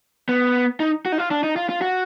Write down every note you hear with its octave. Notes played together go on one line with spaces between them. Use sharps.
B3
D#4
F#4
D#4
F4
D4
D#4
F4
F4
F#4